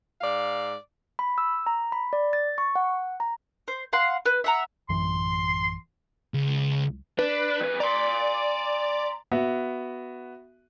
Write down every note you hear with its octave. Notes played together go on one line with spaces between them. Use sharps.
G#2 D5 F5
B5
E6
A#5
B5
D5
A6
C#6
F#5
A#5
C5
F5 F#5 C6
B4
E5 F#5 A#5
A1 F#2 E3 C6
C#2
D4 B4
F2 B4
D5 A#5 C6
B3 F#4 E5